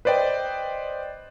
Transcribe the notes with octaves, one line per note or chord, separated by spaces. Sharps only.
B4 C5 D5 D#5 G5